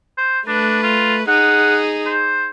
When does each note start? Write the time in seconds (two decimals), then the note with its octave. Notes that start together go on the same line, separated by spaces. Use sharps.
0.18 C5
0.48 A3 D4 B4
0.83 F4
1.28 D#4 G#4 F#5
2.06 C5